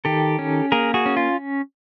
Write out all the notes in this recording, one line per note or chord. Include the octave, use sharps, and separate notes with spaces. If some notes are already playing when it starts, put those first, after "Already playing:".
D#3 G4 A4
C#4
A#3 G#4 A#4
F#4 G#4
C#4
F4